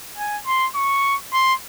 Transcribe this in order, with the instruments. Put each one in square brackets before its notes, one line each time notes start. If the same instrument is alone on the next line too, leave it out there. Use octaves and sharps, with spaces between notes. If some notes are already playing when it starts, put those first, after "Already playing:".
[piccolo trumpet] G#5
C6
C#6
C6